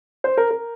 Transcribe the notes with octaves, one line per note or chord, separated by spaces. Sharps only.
C5
A#4
A#4